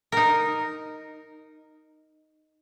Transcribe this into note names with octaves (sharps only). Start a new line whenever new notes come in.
D#4 A#4